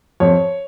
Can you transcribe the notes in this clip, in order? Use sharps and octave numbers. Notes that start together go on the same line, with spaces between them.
F2 C#5